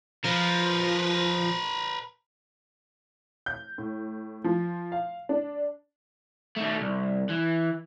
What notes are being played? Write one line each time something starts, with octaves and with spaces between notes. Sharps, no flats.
F3 A#4 B4
G6
A2
F3
F5
D4
D#3 A3
C2
E3